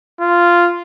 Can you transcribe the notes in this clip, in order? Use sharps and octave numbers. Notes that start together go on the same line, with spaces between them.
F4